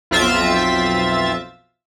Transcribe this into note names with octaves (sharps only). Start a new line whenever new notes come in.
B1 F2 C4 F4 E5 A6